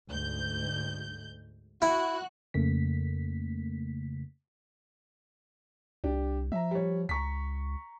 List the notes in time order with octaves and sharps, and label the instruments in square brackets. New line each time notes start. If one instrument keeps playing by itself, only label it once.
[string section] D2 G#2 G6
[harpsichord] E4 [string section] F#4 F#6
[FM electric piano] F2 C#3 A3 A#3 B6
[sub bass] C2 [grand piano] D4 G4
[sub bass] F3 [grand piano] E5 A#5
[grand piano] G3 C#5
[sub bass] C#2 [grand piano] A#5 C#6 B6